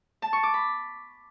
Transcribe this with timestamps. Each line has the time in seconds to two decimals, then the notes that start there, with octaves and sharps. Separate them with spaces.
0.22 A5
0.33 C#6
0.43 D6
0.54 B5